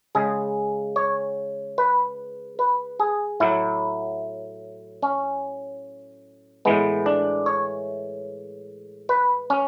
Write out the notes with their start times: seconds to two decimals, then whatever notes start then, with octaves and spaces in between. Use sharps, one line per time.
0.15 C#3 G#3 G#4
0.96 C#5
1.78 B4
2.59 B4
3.00 G#4
3.40 A2 F#3 E4
5.03 C#4
6.65 A2 E3 G#3 B3
7.06 D4
7.46 C#5
9.09 B4
9.50 C#4